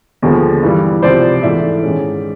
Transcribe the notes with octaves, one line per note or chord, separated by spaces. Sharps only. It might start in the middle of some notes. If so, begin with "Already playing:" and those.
D#2 D3 F3 G#3 B3
G2 E3 G3
C#2 C3 F3 C5 D5
G#2 E3 A3 D5 E5
G#2 D#3 G#3 C#4